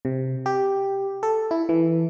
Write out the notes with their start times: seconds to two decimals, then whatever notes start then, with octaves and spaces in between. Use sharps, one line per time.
0.05 C3
0.46 G4
1.23 A4
1.51 E4
1.69 E3